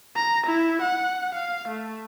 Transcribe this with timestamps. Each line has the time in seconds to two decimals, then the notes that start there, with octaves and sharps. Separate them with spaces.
0.16 A#5
0.46 E4
0.81 F#5
1.34 F5
1.68 A3